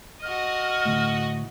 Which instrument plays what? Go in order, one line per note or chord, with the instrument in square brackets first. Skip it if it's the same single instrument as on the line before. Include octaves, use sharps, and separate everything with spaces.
[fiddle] F#4 D#5 [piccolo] F6
[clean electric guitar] D2 A2